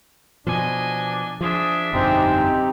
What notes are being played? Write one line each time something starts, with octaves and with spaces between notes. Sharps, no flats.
B2 F3 D4 D#5 G#5
F3 D4 G#4 E5
G1 F2 B2 G#3 C4 D#4 G4